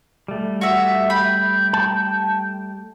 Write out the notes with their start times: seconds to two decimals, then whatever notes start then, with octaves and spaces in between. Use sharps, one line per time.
0.28 G3 A3
0.61 F#4 E5
1.10 G5 B5
1.73 A5